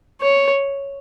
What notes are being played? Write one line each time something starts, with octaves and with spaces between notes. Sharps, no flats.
C#5